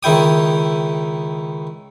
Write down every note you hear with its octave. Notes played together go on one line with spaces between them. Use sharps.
C#2 D#3 E4 G5 D#6